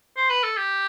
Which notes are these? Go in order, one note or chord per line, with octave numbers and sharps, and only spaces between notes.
C5
B4
A4
G4